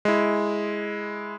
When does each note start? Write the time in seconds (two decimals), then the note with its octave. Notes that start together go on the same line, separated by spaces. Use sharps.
0.05 G#3 E4